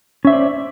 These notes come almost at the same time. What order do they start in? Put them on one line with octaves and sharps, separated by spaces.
C#4 E5 C5 D5